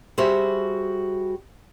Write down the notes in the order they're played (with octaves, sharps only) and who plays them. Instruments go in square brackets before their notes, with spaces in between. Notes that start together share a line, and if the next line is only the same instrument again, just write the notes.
[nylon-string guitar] G3 F#4 G#4 C5 E5